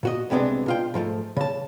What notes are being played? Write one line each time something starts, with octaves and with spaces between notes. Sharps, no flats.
A#2 F#4 D#5
C2 C3 G#3 B3 D4
B2 F4 G5
G#2 F3 G#3 A3
C#3 A5